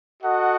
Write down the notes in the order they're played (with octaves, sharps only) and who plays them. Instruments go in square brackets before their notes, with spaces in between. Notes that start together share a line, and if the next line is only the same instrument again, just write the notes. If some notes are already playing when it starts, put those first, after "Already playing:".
[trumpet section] F#4 A4 D#5 F#5